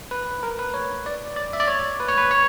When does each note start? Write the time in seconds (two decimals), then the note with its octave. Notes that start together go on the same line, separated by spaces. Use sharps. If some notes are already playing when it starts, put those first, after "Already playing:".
0.11 B4
0.43 A#4
0.59 B4
0.74 C#5
1.06 D5
1.36 D5
1.53 E5
1.60 D5
1.68 C#5
2.00 B4
2.09 C#5
2.18 B4
2.31 C#5